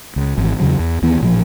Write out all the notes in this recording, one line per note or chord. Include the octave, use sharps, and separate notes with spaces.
C#2
G#1 E3
E2 C#3 F#3
E2
D#2 D#3 E3 B3
A1 A#2 F3